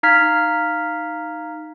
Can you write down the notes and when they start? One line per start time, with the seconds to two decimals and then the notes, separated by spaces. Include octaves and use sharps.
0.03 D#4 F5 A#5 F6 G#6 B6